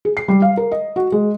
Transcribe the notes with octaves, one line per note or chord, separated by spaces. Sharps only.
G#4
C7
G3
F5
A#4
D#5
F#4
G#3